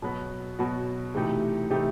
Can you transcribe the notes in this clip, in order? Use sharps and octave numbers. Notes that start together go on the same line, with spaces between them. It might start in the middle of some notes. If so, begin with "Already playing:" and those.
B2 F#3 B3 F#4
B2 F#3 B3 F#4
C3 E3 A3 D#4 G4
C3 E3 A3 D#4 G4